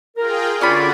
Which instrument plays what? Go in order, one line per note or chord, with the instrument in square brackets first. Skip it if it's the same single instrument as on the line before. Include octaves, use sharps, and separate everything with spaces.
[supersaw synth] F4 G#4 G5 [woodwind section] A#4
[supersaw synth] D3 F#4 [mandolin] C#4 G#4 B5 [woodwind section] F4 D5